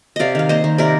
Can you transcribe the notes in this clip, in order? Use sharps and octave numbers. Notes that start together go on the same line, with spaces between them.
C3 D5 D#5 F5
D#3 F5
A#3 C5 D#5
D#3
C3 A#4 D5